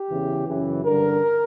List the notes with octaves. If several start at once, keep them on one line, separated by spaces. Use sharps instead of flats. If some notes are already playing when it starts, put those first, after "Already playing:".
Already playing: G4
E2 C#3 E3
F#2 C#3 E3
G2 D3 A#4